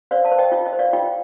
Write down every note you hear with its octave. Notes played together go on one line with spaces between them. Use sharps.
C5 D5 F5
F5 A5
C5
D#5 G5
F4 D#5
D#5
C5
D5 F5
F4 D#5 G5